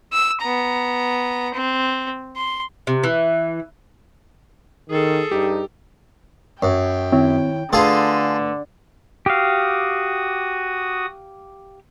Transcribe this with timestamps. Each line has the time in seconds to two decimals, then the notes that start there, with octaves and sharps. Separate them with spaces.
0.13 E6
0.41 B3 A#5
1.54 C4
2.36 C6
2.87 C3
3.04 E3
4.90 D#3 G#4 A4
5.31 G2 D#4 G4
6.63 F#2 C#5 G5
7.12 D#3 C4 E4 C#5
7.73 D3 A3 F4 G#4 A4 B4 C6
9.26 F#4 G4 F5 D#6